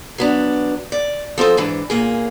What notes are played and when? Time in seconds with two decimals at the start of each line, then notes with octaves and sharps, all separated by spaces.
0.18 F#3 B3 D4
0.92 D5
1.38 F3 C4 A4 D#5
1.57 G#2 E3 D4
1.90 A#2 A#3 G#4